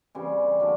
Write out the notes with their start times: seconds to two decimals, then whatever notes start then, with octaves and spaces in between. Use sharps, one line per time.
0.15 C#3 E3 G3 C4
0.60 D3 F#3 A#3